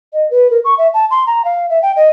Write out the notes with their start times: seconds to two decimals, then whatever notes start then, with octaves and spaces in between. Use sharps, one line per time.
0.13 D#5
0.31 B4
0.51 A#4
0.65 C#6
0.78 E5
0.94 A5
1.11 C6
1.27 A#5
1.45 F5
1.70 E5
1.82 G5
1.96 D#5